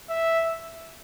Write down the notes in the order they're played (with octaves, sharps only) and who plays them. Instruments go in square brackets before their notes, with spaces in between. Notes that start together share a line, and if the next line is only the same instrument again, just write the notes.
[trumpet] E5